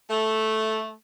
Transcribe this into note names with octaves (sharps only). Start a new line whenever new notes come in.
A3